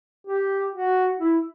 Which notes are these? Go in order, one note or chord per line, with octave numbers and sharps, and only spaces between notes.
G4
F#4
E4